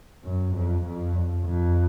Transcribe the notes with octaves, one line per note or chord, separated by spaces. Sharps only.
F#2
F2
F2
F2